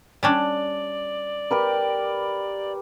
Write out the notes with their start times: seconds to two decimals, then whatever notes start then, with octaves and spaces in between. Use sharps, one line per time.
0.23 G3 C#4 D4 D5
1.51 G4 A#4 B4